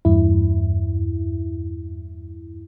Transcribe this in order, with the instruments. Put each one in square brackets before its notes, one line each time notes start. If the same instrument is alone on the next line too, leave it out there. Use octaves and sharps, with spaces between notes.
[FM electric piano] E2 G2 E4